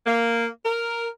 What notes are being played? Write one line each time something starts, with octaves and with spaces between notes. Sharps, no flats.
A#3
A#4